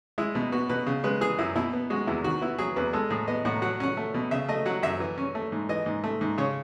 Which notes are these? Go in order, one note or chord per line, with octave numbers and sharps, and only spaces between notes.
G#3 E4
B2
B3 F#4
B2 B4
C#3
G#3 B4
E3 G#4
F#2 E4
B2 E4
B3
G#3 F#4
E2 E4
D#3 F#4
B3 E4
F#3 G#4
E2 B4
G#3 A4
A2 G#4
B3 D#5
A2 F#5
F#3 F#5
C#4 F#5
A3
B2
C#3 E5
A3 D#5
F#3 F#5
F#2 E5
E3
C#4
A3
G#2
E3 D#5
G#2
A3
G#2
C#3 C#5